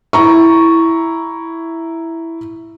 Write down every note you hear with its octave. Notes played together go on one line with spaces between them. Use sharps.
E4 A#5 C#6